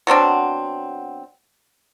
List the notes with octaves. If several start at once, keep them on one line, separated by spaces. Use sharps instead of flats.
B2 F#3 C4 D4